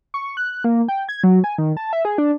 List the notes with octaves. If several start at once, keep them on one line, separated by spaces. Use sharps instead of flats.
C#6
F#6
A#3
G5
G#6
F#3
G#5
D#3
A5
E5
G#4
D4